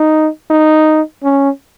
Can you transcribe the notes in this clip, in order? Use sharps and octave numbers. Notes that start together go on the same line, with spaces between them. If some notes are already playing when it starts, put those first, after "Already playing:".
Already playing: D#4
D#4
C#4